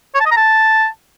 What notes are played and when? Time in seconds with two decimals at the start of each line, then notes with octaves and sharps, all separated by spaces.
0.15 C#5
0.20 A5
0.26 D#5
0.31 A#5
0.37 A5